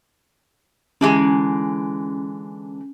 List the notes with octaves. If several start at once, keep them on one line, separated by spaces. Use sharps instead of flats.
D3 E3 G#3 C#4